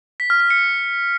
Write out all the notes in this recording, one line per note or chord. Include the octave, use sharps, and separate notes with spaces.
B6
F6
F6
C#7